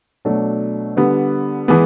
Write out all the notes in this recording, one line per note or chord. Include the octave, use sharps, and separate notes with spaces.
B2 F#3 A3 D4
D3 G3 B3
E3 G#3 B3